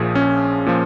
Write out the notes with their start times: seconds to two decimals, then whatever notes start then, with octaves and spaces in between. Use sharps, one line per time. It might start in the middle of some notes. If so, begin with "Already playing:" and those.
Already playing: A#1 A#2 F3 G#4
0.15 C#4
0.66 A#2 F3